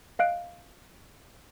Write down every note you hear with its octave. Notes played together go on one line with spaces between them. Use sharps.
D#5 F5 F#6 D7